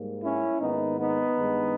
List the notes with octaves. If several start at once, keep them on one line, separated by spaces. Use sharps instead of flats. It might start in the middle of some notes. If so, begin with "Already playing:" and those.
Already playing: G#2 G3 A#3
C#4 E4
G#2 D#3 A#3 B3 D#4
B3 D#4
G2 D#3 G#3